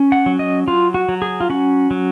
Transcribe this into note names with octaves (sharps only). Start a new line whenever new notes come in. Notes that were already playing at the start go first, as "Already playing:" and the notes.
Already playing: C#4
F#5
F#3
D#5
F#3 F4
F#4
F#3
G#4
F4
C#4 F#4
F#3